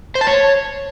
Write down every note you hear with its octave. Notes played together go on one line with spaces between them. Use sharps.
C5
A5
C#5